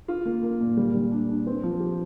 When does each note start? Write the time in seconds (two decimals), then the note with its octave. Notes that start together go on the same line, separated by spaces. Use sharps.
0.08 F4
0.26 A#3
0.43 A#3
0.61 A#2
0.77 G3
0.94 G3
1.11 D4
1.29 D4
1.47 C4
1.63 F3
1.80 G4